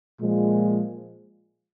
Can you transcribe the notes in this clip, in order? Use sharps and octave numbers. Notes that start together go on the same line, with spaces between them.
A#2 F3 G#3